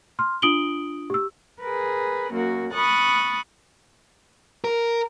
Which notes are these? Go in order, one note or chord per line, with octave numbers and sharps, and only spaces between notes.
C6 F6
D4 F4 D#6 D7 F#7 G7
G4 E6
G#4 A#4 B4
F#2 A#3 F#4
B5 C#6 D#6 F#6 A6
A#4